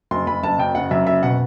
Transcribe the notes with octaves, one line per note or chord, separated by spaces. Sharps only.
F#1 C6
F#1 B5
F#1 A5
F#2 G5
F#1 F#5
F#2 E5
F#1 E5
B2 F#5